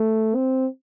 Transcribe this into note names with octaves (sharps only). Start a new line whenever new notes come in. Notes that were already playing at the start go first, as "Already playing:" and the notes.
Already playing: A3
C4